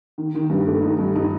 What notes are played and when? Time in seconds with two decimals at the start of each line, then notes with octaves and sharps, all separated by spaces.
0.18 D#3
0.35 D#3
0.50 G2
0.67 A3
0.82 D#4
0.99 G2
1.16 D#4